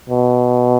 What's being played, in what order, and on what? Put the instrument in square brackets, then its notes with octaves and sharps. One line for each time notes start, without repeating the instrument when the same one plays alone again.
[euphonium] B2